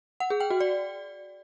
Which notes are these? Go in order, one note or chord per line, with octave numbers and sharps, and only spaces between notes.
F#5
G#4
G5
F#4
D5